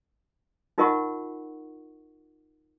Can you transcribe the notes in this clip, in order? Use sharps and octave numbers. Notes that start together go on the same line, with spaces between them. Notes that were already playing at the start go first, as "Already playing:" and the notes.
D#4 F4 A#4 D#5 F#5 C#6